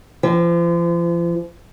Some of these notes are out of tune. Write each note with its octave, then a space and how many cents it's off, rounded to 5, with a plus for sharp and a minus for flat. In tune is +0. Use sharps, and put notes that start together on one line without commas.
F3 -40